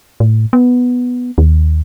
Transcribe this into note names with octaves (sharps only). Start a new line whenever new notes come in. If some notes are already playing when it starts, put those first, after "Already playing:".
A2
B3
D#2